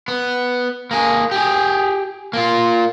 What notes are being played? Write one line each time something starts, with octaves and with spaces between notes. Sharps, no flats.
B3
A#3 G#4
G4 G#4
A#3 F4